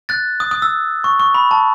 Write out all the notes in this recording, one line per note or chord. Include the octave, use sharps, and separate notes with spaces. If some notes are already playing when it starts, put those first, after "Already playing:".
F#6 A6
D#6
D#6
E6
C#6
C#6
B5
A5